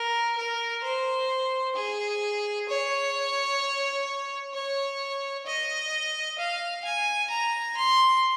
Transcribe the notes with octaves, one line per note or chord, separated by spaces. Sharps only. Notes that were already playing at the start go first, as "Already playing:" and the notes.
Already playing: A#4
A#4
C5
G#4
C#5
C#5
D#5
F5
G#5
A#5
C6